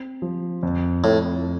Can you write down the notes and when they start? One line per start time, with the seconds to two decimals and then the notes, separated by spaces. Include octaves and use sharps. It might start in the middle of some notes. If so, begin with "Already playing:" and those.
Already playing: C4
0.22 F3
0.63 F2
1.04 F2 A2